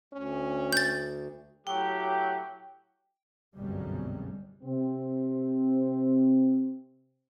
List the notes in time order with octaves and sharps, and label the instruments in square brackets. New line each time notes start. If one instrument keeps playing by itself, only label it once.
[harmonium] D2 [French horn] C#4
[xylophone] G6 A6
[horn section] A2 F#3 G4 [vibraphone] G5
[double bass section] G1 C2 F#2 B2 G3 G#3
[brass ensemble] C3 C4